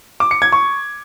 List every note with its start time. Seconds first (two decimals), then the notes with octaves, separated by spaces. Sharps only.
0.20 D6
0.31 C#7
0.42 G#6
0.52 C#6